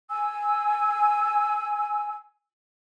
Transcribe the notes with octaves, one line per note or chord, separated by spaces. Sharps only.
G#5 E6